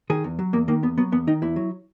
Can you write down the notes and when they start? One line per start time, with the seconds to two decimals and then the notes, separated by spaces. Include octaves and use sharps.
0.10 D#3 G#4
0.24 E2
0.39 F#3
0.53 E2 A#3
0.68 D#3 A#3
0.83 E2 B3
0.98 F#3 B3
1.12 E2 B3
1.27 D#3 D#4
1.42 E2 E4
1.56 F#3